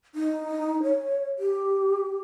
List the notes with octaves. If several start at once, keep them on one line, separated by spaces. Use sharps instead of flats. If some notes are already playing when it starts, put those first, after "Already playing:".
D#4
C#5
G4